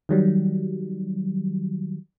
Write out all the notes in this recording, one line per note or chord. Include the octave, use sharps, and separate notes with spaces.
D#3 F#3 G3